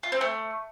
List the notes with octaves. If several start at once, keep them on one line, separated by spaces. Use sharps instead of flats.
F4
C4
A3